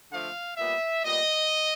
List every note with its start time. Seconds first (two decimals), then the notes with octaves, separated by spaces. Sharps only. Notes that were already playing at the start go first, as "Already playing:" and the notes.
0.11 D3 F3 A3 F5
0.57 A#2 G3 B3 E5
1.03 A#2 G3 B3 D#5